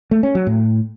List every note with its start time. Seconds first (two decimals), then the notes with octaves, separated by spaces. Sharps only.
0.11 A3
0.23 C#4
0.35 F#3
0.47 A2